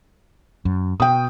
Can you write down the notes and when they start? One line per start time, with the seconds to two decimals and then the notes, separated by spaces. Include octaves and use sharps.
0.65 F#2
1.00 B2 G5 D#6